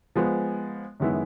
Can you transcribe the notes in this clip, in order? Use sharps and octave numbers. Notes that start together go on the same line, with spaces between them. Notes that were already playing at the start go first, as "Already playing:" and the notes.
F3 G#3 B3
F#2 D#3 G#3 B3 E4